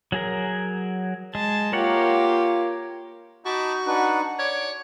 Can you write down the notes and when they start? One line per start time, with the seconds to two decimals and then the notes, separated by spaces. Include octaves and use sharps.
0.12 F#3 G#4 A#4
1.35 G#3 A5
1.73 A#3 F4 G4 A#4 C#5 F#5
3.46 D#4 F#4 A5 B5 D6
3.87 D4 D#4 B4 F#5
4.39 C#5 D5 D6